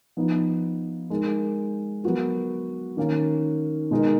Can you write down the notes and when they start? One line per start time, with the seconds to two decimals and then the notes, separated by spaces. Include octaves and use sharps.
0.17 F3 B3 D#4
1.10 G#3 D#4 A#4
2.04 F#3 B3 F#4 A#4
2.97 D#3 A#3 C#4
3.91 B2 G#3 D#4 A#4